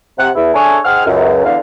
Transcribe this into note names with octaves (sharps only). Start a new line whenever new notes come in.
C3 F#5
E2 E4
D4 G#4 A4 C#5 E5 G#5
G#2 G#4 F#5 G5 F6
C#2 F#2
E2 D3 F5